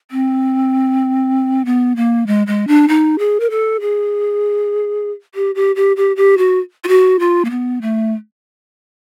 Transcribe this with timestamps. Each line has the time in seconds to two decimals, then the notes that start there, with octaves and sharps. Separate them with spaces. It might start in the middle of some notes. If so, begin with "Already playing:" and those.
0.11 C4
1.65 B3
1.96 A#3
2.27 G#3
2.47 G#3
2.68 D4
2.88 D#4
3.19 G#4
3.40 A#4
3.50 A4
3.80 G#4
5.35 G4
5.55 G4
5.76 G4
5.97 G4
6.17 G4
6.38 F#4
6.84 F4
6.88 F#4
7.19 F4
7.45 A#3
7.50 B3
7.82 A3